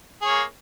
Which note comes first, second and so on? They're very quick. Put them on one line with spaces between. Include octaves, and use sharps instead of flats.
G#4 C#5 A#3